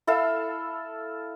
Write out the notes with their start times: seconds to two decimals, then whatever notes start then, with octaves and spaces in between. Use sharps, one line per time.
0.07 E4 A4 E5 F5